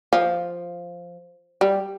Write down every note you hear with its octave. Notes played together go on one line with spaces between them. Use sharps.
F3
G3